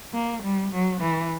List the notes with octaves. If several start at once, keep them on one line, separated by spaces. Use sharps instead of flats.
A#3
G3
F#3
E3